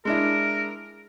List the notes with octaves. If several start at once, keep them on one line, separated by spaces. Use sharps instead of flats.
G#3 D4 E4 A#4